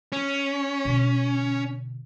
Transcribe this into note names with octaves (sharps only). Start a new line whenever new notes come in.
C#4
B2 D3